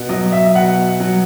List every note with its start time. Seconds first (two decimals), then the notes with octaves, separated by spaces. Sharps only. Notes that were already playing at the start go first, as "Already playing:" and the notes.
Already playing: B2
0.09 F#3 D#5
0.32 E5
0.55 B2 F#5
1.00 F#3